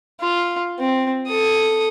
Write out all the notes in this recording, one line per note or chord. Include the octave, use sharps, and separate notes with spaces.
F4
C4
A4 D#6